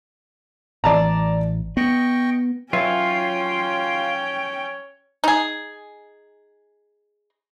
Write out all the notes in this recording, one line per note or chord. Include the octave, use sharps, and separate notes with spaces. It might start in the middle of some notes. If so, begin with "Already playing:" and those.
A1 E3 D5 A5 A#5
B3 D#5 G5 C#6
F#3 C#4 F4 B4 C#5 E5 G5
D#4 G#4